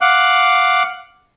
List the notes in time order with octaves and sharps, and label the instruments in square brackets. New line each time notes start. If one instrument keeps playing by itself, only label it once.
[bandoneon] F5 F#5 D6 F#6